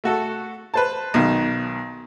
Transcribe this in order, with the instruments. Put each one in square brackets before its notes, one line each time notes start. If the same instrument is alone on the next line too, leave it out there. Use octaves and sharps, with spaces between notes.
[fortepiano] A3 F#4 A4
B4 C5 A5
B1 B2 D#3